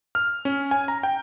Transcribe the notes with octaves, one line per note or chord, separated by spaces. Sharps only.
F6
C#4
G#5
A#5
G5